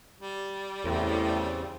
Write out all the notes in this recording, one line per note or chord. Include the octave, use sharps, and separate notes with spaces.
G3
E2 A2 C#3 C4